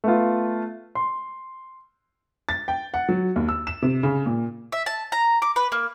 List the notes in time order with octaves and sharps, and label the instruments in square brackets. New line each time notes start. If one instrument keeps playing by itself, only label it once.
[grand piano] A3 B3 F4
C6
[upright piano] A6
G5
F#5
F#3
D#2
E6
E7
C3
C#3
A#2
[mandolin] E5
A5
A#5
D6
B4
A#3